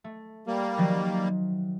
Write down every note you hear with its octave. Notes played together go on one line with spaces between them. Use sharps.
A3
G3 A#3
D#3 F3 F#3